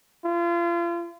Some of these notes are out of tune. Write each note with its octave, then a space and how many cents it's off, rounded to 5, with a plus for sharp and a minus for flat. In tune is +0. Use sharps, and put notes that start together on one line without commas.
F4 -35